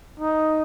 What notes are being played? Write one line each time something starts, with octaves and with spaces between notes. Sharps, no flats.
D#4